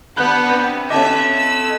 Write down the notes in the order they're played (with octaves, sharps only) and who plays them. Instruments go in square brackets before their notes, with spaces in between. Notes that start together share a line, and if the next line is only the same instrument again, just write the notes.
[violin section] B3 D4 [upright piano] B5 F#6 G6
[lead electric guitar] C3 [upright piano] G6
[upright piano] C#4 A5 D6 [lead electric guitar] A4 D#5 [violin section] E5
[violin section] E6